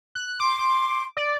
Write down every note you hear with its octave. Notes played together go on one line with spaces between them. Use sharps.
F#6
C6 D6
D6
D5